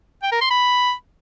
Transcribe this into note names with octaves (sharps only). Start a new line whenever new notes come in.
G5
A#4
C6
B5